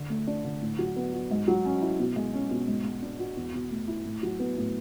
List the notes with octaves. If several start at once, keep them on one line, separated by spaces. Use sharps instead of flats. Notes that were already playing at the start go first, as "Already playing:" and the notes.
Already playing: D3
A3
D4
D3
A2
F#3
B3
F#4
G#2
F#3
C#4
E4
B2
G#3
C#4
B2
G#2
G#3
D4
F#4
E2
B2
A3
E4
A2
F#3
B3
A2